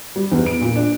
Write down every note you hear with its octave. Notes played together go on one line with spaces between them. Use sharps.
G3
E2
D7
A#2
D4